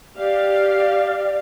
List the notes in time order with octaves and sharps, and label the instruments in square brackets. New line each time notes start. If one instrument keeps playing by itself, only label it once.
[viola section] G4 F5 [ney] D5